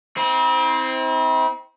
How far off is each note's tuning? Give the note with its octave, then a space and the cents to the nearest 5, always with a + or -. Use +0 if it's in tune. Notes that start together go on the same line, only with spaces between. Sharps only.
C4 +0 E4 -45